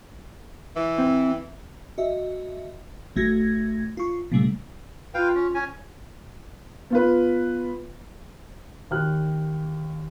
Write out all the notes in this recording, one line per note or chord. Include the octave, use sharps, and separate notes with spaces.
E3
C4
F#4 D#5 E5
G#1 A2 A3 F#4 G#6 A#6
F4 C#6
A#2 C#3 G3 A3
F4 B4 F5 G5
C#4
C#4 G#5
B3 F4 B4
D#2 G4 F6 F#6